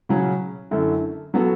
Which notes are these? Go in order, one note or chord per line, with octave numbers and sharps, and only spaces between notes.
C#3 F#3 C#4
F#2 D3 A3 E4
F#3 B3 F#4 A4